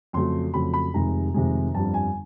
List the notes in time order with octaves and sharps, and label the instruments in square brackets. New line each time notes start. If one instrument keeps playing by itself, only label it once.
[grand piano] F2 C#3 F#3 A3 C6
F2 C#3 F#3 A3 B5
B5
F1 F2 C3 D#3 G#3 A#5
F1 F2 C3 D#3 G#3
G1 F2 D3 G3 A5
G#5